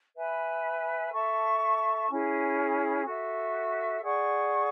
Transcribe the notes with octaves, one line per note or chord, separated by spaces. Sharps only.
B4 E5 G#5 B5
A4 E5 A5 C#6
C#4 E4 G#4
F#4 A4 E5
G#4 D5 F#5 C#6